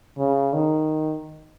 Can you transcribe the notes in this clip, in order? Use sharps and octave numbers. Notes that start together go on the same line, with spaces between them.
C#3
D#3